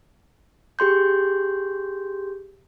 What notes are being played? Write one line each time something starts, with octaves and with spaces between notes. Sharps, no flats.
G4 G#4 C6 G6